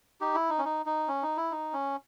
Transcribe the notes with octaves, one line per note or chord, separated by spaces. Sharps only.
D#4 G4
E4
D#4
C#4
D#4
D#4
C#4
D#4
E4
D#4
C#4